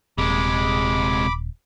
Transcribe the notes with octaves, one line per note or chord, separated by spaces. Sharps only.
D#1 C3 G#3 B5 D6